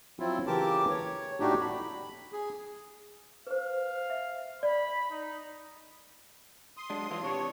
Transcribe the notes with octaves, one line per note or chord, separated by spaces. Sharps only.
F3 F#3 C4 E4 F4
C#3 E3 G4 A#4 A5 D6
C#5
A2 A3 D4 D#4 F#4 G4
B5
G#4
B4 C5 F5
E5
D5 B5
D#4
C6 D#6
F#3 G#3 D4
E3 F#3 F4
C3 D4 C#5